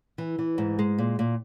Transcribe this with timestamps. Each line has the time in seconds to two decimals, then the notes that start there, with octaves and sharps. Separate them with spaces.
0.18 E3
0.39 E3
0.58 G#2
0.79 G#3
0.98 A#2
1.19 A#2